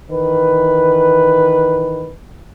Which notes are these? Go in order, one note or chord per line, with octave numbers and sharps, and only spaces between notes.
D#3 E3 B4